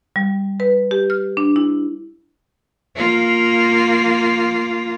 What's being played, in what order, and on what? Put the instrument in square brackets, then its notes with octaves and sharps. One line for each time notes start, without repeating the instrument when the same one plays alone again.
[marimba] G3
B4
G4
F6
D4
E4
[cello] A#3 F4